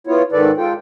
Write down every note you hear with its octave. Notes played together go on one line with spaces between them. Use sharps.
B3 E4 F4 C#5
G#2 D#3 A4 B4 D5
G#3 F4 A4 G5